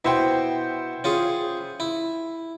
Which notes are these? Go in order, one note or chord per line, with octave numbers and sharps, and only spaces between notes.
B2 E4 C5 G5
C#4 F4 G#4
E4